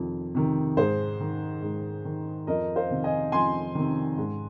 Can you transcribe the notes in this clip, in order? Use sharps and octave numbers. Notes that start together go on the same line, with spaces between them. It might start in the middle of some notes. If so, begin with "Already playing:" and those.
Already playing: F2 C3 D#3
C3 D#3
G#2 G#4 C5
D#3
G#2
D#3
F2 A#4 D#5
C5 F5
C3 D#3
D#5 G#5
F2 G#5 C6
C3 D#3
G#2